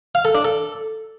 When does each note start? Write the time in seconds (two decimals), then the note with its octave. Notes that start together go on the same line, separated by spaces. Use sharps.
0.15 F5
0.25 A4
0.35 D4
0.45 A4